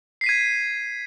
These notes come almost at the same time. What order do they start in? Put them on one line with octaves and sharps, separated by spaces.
C7 B6 D#7 G#6